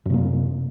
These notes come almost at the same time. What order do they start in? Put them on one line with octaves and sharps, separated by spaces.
F#2 C3 A#3